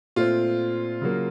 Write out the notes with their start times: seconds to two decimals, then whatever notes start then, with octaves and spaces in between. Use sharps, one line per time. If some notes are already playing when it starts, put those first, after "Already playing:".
0.16 A#2 A3 C4 F4
1.02 C#3 F#3 A#3